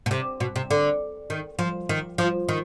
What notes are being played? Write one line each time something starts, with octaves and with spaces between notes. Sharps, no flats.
B2
C3
B2
C3
D3
D#3
F3
D#3
F3
D#3